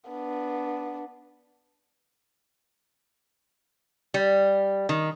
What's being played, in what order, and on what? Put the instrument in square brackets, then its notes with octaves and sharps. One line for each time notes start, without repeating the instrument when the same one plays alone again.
[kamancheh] B3 D4
[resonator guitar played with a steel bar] G3
D#3